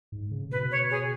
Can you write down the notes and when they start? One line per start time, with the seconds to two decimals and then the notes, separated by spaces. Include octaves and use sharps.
0.12 G#2
0.31 C#3
0.52 B2 B4
0.71 C#5
0.91 G#4